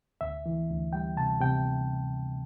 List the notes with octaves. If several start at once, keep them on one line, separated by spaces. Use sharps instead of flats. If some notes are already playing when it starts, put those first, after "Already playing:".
D2 E5
E3
D2
G3 G5
C3 A5
C3 G5